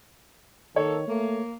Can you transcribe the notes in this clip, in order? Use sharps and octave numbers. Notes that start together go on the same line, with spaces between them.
D#3 A#3 A4 C#5
A3 A#3